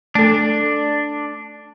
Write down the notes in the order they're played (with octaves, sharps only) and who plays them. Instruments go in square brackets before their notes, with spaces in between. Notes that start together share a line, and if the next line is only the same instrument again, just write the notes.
[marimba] A3 A4 [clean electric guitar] D4